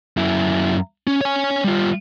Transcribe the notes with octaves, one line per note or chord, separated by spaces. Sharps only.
F#2 E4
C#4
C#5 G#5
G3 F4